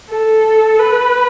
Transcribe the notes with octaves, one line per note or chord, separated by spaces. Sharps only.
A4
B4